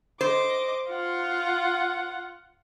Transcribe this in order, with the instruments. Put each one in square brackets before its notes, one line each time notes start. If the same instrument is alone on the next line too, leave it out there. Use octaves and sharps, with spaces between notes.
[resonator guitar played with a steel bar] C5 [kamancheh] D#5 D6
[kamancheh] F4 F#5